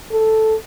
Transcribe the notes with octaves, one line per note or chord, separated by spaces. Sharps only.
A4